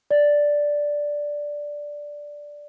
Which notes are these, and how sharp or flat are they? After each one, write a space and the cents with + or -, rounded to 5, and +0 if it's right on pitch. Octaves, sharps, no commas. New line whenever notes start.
D5 +0